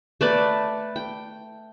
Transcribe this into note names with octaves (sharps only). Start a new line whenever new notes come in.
A3 B4 D5
G5